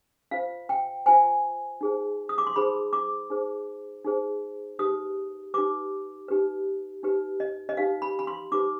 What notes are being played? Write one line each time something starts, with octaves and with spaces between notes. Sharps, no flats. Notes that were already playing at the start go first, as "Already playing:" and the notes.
F4 C5 F5
G5
F4 C5 G#5
D#4 G#4 C5
D#6
D6
C6
D#4 G#4 C5 B5
D6
D#4 G#4 C5
D#4 G#4 C5
D#4 G4 B4 D#6
D#4 G4 B4 D6
D#4 G4 B4
D#4 G4 B4
D#5
D#5
D#4 G4 B4 F5
B5
B5
C6
D#4 G4 B4 D6